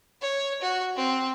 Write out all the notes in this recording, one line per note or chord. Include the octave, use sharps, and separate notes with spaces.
C#5
F#4
C4